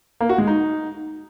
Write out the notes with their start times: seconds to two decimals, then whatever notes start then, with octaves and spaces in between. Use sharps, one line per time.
0.21 A#3
0.29 F#4
0.38 G#3
0.47 D#4